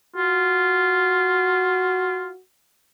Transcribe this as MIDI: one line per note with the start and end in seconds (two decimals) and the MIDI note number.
0.16 2.31 65
0.16 2.40 66